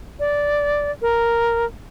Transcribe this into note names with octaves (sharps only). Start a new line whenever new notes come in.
D5
A#4